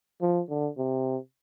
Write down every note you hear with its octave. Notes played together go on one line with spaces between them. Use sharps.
F3
D3
C3